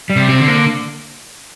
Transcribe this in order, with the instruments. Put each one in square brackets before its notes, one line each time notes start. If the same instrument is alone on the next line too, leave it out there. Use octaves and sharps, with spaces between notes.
[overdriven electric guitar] G3
[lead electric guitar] C3
[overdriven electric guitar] C4
[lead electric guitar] D3
[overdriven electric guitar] A#3